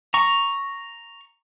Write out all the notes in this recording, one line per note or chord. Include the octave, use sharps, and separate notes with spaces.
A#5 C#6